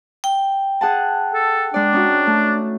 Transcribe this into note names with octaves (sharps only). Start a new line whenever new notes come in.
G5
G#4 F#5 A5
A4
G#3 D4 D5
C#4 D#4 F#4
A3